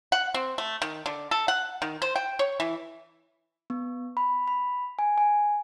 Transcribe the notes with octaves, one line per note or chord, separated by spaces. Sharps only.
F#5
C4
A3
D#3
D3
A4
F#5
D#3
C5
G5
C#5
E3
B3
B5
B5
G#5
G#5